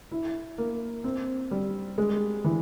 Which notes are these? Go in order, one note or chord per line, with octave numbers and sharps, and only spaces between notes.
E4
A#3
C4
G3
G#3
E3